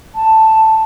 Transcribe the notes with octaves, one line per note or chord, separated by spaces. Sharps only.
A5